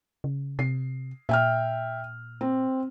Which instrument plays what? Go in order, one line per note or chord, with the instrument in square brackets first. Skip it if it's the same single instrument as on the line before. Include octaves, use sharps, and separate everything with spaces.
[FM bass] C#3
[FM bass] C3 [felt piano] C7
[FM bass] A#2 [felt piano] E5 G5 F6
[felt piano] C4